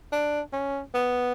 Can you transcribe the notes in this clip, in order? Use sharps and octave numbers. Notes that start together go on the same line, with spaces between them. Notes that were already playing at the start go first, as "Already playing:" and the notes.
D4
C#4
B3